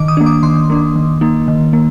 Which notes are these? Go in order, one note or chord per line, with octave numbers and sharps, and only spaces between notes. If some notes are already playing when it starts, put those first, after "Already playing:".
Already playing: D#3 D6
D#6
A#3 D4
D6
D#3 C6
A#3 D4
D#3
A#3 D#4
D#3
A#3